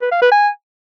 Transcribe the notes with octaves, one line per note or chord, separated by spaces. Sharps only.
B4
F5
B4
G#5